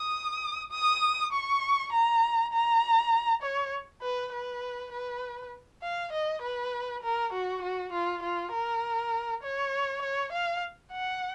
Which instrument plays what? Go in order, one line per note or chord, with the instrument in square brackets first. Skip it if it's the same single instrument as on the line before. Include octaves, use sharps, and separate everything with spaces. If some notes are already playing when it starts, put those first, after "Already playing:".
Already playing: [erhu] D#6
D#6
C#6
A#5
A#5
C#5
B4
B4
B4
F5
D#5
B4
A#4
F#4
F#4
F4
F4
A#4
C#5
C#5
F5
F#5